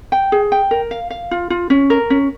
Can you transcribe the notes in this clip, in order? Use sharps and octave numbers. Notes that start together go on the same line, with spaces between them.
G5
G#4
G5
A#4
F5
F5
F4
F4
C#4
A#4
C#4